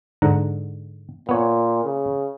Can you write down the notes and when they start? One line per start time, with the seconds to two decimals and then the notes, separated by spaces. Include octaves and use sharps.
0.22 G#2 D3 A#5
1.29 A#2 B3 C#5
1.85 C#3